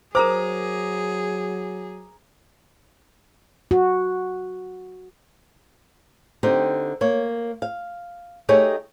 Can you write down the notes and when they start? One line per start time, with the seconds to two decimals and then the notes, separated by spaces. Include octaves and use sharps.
0.15 F#3 G#4 A#4 C5 A#5 D6
3.71 F#4
6.43 D3 C4 D#4 G4
7.01 A#3 C#5
7.62 F5
8.49 A3 D#4 G4 G#4 C#5